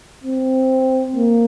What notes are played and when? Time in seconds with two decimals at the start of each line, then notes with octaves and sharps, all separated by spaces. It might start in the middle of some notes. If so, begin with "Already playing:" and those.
0.24 C4
1.16 A#3